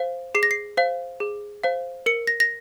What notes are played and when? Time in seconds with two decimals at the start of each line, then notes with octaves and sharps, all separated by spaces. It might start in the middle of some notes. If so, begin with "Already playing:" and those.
Already playing: C5 F5
0.35 G#4 C7
0.43 A#6
0.51 C7
0.77 C5 F5
1.20 G#4
1.64 C5 F5
2.06 A#4 C#7
2.27 A#6
2.40 A#6